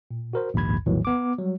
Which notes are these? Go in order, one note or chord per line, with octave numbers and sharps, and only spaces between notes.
A#2
F#4 A#4 C5
A#1 D#2 G#2 B5 G#6
A#1 E2 A2 D#3 E3 F#3
B3 D6
F#3 G3